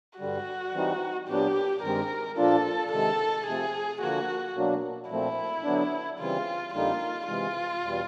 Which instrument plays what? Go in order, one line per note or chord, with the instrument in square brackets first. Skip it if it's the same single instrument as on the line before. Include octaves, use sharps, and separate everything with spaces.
[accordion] G2 D3 G3 [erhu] F#4
[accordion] E3 G3 C4 D#4
[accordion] A#2 F#3 B3 D4 [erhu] G4
[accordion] G2 D#3 G#3 C4 [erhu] A#4
[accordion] A#2 F3 A#3 D4 F4 [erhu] A4
[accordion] C3 D#3 G#3 [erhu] A4
[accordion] C3 F3 A3 C4 [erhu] G#4
[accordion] D3 F3 A#3 [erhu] F#4
[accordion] B2 F#3 A#3 D4 F#4
[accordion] A#2 F3 A3 C4 [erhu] E4
[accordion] D3 F#3 B3 D4
[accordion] C#3 E3 G3 C4 [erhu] F4
[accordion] F2 D3 G3 A#3 D#4 [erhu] F4
[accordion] C3 E3 G#3 [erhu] F4
[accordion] E2 B2 G3